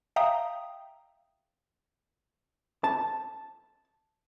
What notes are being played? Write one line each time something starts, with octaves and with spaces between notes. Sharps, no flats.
E5 F5 G5 A#5 D#6
A5